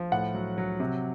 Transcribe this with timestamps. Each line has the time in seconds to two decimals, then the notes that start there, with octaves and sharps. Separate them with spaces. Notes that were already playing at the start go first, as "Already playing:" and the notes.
Already playing: F3
0.12 A2 F#5
0.34 F#3
0.58 F#3
0.80 C3